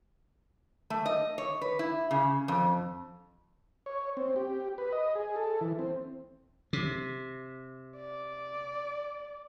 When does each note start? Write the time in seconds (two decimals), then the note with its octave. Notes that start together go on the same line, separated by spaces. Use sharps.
0.90 A3
1.06 D#5
1.38 C#5
1.62 B4
1.79 E4
2.11 C#3
2.48 F2
3.86 C#5
4.17 C4
4.36 G4
4.78 B4
4.92 D#5
5.15 G#4
5.36 A4
5.61 E3
5.79 C4
6.73 C3
7.97 D5